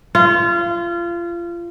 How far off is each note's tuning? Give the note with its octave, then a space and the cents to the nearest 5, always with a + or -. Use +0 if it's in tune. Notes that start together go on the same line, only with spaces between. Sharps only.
F4 -25